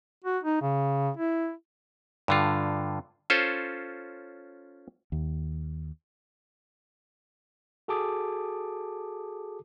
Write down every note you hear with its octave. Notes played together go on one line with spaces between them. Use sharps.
F#4
D#4
C#3
E4
G2 D3 F4
C#4 F4 A4 C5
D#2
F#4 G#4 A4 A5 D6 D#6